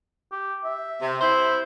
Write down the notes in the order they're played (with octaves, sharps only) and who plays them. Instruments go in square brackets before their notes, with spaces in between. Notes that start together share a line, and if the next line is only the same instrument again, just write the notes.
[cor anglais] G4
E5
[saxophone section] C3
E4 C5